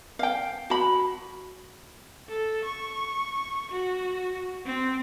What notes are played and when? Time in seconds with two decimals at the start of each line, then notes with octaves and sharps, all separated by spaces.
0.19 F5 G5
0.70 F#4 B5
2.29 A4
2.64 C#6
3.71 F#4
4.66 C4